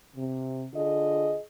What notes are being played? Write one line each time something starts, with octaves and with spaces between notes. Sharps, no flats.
C3
D3 F4 G#4 D#5